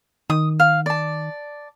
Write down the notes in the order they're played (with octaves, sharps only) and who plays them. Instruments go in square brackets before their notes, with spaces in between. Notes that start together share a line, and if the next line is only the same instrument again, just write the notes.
[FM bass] D#3 [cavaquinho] D#6
[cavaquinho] F5
D5 A5